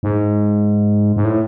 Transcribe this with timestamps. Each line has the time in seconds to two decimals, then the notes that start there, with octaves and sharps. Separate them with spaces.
0.03 G#2
1.16 G#2
1.25 A2